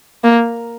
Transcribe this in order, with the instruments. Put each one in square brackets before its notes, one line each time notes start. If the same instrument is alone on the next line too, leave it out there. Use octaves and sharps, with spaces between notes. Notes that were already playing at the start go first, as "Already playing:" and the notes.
[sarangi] A#3